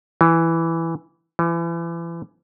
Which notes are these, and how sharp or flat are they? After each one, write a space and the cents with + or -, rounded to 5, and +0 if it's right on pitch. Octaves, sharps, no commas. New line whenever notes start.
E3 +5
E3 +35